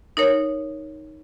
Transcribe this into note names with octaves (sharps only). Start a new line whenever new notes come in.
D#4 A#4 C#5